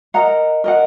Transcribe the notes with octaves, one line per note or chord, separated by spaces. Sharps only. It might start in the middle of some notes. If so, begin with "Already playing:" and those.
A#4 D#5 F#5 A#5
A#4 D#5 F#5